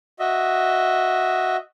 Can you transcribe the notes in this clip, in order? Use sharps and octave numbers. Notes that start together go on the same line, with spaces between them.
F#4 D#5 E5